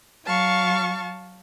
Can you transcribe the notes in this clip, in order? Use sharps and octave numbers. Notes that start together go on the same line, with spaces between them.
F#3 F5 A5 C#6